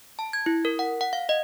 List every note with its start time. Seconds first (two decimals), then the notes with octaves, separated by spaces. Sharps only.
0.19 A5
0.33 G#6
0.46 E4
0.65 A#4
0.79 F#5
1.01 F#5
1.13 F5
1.29 D#5